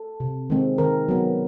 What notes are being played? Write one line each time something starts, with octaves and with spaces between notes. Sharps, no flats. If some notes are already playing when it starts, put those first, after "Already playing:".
Already playing: A4
C3
D#3 G#3 C4
D#3 A#4
F#3 B3